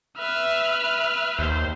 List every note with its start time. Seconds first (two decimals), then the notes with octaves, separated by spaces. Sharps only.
0.19 B4 E5 F6
0.70 E5
1.39 D#2 C5